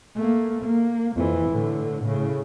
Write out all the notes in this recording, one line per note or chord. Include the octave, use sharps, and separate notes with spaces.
A3 A#3
A#3
F2 E3
A2 D3
A2 C#3